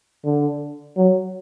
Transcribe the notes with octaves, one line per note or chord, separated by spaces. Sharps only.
D3
F#3